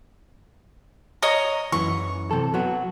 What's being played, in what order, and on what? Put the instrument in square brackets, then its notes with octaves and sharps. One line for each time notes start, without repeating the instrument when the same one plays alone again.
[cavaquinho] C#5 D#5 A#5
[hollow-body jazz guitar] F#2 E3 [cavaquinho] C#6
[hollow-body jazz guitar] C3 A4
F#3 B3 F#4